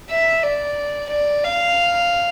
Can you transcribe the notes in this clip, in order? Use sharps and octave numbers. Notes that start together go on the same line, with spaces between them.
E5
D5
D5
F5